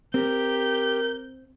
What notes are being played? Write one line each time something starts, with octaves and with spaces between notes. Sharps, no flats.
C4 G4 A#4 G6